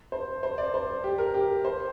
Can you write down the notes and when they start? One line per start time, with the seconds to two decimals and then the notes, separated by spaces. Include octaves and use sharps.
0.12 C5
0.43 C5
0.58 D5
0.74 C5
1.04 G4
1.18 A#4
1.34 G4
1.65 C5